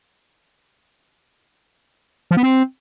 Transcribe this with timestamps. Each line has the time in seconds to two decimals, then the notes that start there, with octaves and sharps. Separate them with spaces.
2.31 F3
2.37 B3
2.43 C4